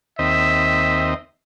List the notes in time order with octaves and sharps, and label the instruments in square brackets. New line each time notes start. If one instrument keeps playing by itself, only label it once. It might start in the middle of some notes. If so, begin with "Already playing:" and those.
[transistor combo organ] D#2 C4 D#5 [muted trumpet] E5